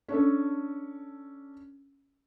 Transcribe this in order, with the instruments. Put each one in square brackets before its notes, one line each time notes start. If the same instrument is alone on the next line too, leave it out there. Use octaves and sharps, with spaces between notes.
[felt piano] C#4 D4 A4